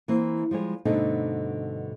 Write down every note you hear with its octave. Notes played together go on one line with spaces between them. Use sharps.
E3 A#3 C4
F3 G3 G#3 C#5
G2 B2 D3 A3 C4 D#4